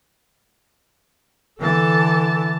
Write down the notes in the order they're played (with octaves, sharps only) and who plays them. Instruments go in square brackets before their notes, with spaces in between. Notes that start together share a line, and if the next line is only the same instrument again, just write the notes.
[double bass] D3 E3 [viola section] A4 A5